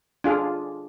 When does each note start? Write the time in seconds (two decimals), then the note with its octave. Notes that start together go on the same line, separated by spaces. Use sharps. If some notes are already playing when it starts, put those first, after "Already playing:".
0.24 D4 F4 G#4